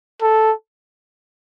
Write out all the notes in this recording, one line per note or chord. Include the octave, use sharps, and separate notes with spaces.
A4